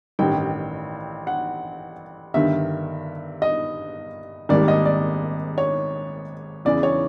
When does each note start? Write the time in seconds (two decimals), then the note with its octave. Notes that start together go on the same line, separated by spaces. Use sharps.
0.19 A1 G2 D#3 G5
1.27 F#5
2.34 G1 G2 D#3 E5
3.42 D#5
4.49 G#1 G#2 D#3 G3 A#3 D5
4.68 D#5
4.85 D5
5.58 C#5
6.65 E2 C#3 E3 D5
6.83 C#5